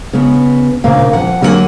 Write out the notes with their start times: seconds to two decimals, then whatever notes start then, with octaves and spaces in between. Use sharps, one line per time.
0.13 C#3 B3
0.84 D2 A#2 C#3 A#3 F5
1.13 F2 F#5
1.42 D3 F#3 A#3 E4 F#5 G#5